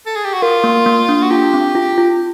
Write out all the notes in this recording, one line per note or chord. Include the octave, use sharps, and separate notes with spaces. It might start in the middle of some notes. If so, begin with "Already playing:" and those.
A4
G#4
G4
F#4
F4 A#4
A#3
A#3
D4
F#4
F4 G4
C4
F4
F4